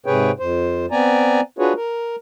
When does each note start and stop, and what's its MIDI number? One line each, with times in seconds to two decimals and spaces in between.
0.06 0.31 44
0.06 0.31 48
0.06 0.31 68
0.06 0.31 71
0.06 0.31 73
0.06 0.31 79
0.39 0.86 41
0.39 0.86 72
0.91 1.41 59
0.91 1.41 60
0.91 1.41 74
0.91 1.41 80
0.91 1.41 82
1.59 1.73 62
1.59 1.73 65
1.59 1.73 66
1.59 1.73 68
1.59 1.73 71
1.59 1.73 73
1.76 2.16 70